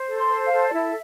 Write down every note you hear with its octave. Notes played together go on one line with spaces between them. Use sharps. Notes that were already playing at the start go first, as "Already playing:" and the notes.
Already playing: C5
A4
C6
C5
F5
A4
D5
E4 E5